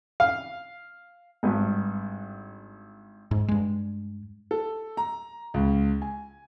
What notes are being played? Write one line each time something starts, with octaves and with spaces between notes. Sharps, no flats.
F5
G#1 G2
G#2
G2 G#3
A4
A#5
C#2
G#5